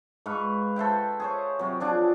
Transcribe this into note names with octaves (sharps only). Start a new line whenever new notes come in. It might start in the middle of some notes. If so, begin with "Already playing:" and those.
G#2 B4 F5 C#6
A4 C5 E5 G5
G#4 C5 C#5
C3 F#3
F3 D4 G#4